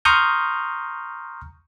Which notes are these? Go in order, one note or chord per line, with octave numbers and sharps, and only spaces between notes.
A#5 C6 C#6 D#6 F6 G6